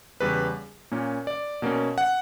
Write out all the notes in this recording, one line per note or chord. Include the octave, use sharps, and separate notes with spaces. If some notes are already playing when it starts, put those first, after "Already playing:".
E2 C#3 G3 B4
A#2 A#3 C#4
D5
B2 A#3 C#4
F#5